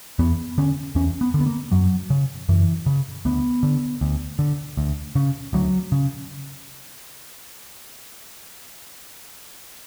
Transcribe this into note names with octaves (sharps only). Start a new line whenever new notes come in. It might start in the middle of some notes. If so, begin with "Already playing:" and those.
E2 B3
D3 C#4
E2 C#4
B3
D3
B3
A#3
F#2 F#3
C#3
F#2 E3
C#3
D2 B3
D3
D2
D3
D2
C#3
D2 F#3
C#3